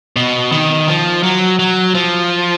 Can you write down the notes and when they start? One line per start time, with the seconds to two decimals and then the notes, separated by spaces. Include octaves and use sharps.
0.16 B2
0.52 D#3
0.88 F3
1.23 F#3
1.59 F#3
1.95 F3